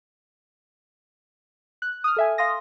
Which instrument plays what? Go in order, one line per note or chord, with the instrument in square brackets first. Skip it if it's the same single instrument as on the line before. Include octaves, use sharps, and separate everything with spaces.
[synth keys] F#6
D#6 F6
A4 E5 G#5
F5 C6 D#6 A#6